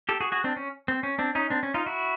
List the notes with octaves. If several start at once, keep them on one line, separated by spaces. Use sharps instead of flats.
G4 A4
F#4 G#4
F#4 G#4
C4 D4
C#4
C4
C#4
C4 D4
C#4 D#4
C4 D4
C#4
D#4 F4
E4 F#4